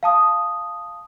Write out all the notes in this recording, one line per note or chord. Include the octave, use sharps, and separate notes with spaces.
F5 A5 D#6